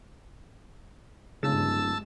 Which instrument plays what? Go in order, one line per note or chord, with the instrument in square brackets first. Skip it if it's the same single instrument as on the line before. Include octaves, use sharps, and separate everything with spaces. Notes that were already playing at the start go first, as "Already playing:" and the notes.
[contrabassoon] D1 [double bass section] G2 G#3 [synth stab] C#3 [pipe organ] A5 E6